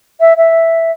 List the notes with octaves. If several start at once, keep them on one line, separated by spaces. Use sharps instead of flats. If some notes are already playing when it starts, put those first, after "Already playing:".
E5
E5